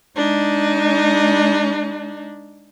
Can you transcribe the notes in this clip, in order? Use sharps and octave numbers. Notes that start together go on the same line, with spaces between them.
G#3 D4 D#4